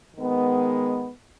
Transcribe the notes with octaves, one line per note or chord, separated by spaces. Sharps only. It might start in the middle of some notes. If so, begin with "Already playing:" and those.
D#3 G#3 B3